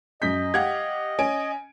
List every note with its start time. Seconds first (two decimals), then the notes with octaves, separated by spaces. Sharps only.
0.22 F#2 D#5 G6 B6
0.54 G4 F5 F#5 G#6
1.19 C#4 G#5 D7